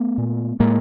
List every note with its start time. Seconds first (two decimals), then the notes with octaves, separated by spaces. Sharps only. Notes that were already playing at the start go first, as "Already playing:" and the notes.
Already playing: A3 B3
0.18 A#2
0.60 A2 G#3 A#3